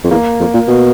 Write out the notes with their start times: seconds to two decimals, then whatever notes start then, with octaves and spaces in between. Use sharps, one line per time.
0.04 F2
0.11 E2 A#3
0.40 F2
0.54 A#2
0.68 B2